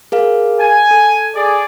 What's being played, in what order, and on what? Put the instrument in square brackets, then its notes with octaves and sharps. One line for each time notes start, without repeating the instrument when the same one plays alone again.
[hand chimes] G#4 A#4 F5
[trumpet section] G#5
[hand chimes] A4
[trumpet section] G#4 D5